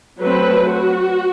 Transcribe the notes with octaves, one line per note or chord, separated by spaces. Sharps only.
F#3 A3 C4 B4
F#4